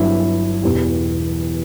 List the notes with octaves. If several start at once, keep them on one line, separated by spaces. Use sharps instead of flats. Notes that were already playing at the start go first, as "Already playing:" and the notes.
Already playing: G1 G2 F#3 E4
E1 E2 B2 G4